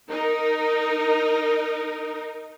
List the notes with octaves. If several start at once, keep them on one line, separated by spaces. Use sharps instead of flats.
D#4 A#4